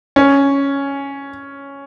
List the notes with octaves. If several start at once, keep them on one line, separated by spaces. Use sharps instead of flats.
C#4